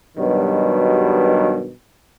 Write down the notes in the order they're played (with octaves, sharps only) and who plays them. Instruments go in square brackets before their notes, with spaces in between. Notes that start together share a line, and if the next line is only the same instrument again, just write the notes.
[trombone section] G2 B2 D#3 F#3 G3